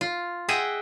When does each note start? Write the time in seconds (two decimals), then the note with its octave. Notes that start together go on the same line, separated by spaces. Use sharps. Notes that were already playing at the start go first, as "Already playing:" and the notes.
0.01 F4
0.48 G#4 D#5 E5 F#5 G5